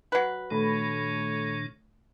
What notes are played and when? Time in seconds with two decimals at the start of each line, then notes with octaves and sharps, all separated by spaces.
0.12 F#3 B4
0.51 A#2 D#3 A3 D4 C#5 B5